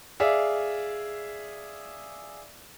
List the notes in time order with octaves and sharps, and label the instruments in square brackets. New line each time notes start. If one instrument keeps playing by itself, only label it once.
[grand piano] G#4 D5 E5 F5